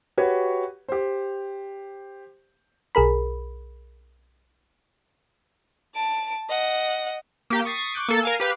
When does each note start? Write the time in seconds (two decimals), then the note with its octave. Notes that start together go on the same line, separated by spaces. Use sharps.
0.18 F#4 G4 B4 C#5
0.88 G4 C5
2.95 B1 G#4 A#4 B5
5.95 A5 D7
6.49 D#5 F#5
7.50 A#3 G4
7.65 C#6 D#6 A6 B6 C7 D#7
7.94 C#6 D6 F#6 G6 D7
8.08 A#3 A4
8.23 A#4 F5 G#5
8.40 G4 B4 F5